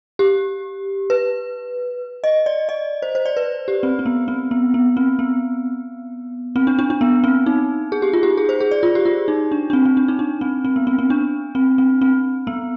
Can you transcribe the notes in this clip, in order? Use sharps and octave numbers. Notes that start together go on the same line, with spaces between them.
G4
B4
D#5
D5
D#5
C5
C5
D5
B4
G4
C4
C4
B3
C4
B3
B3
C4
B3
C4
D4
D4
D4
B3
C4
D#4
G#4
G4
F4
G4
G#4
C5
G#4
D5
F4
G4
F4
D#4
D4
D4
C4
C4
D4
D#4
D4
C4
C4
B3
C4
C4
D4
C4
C4
C4
B3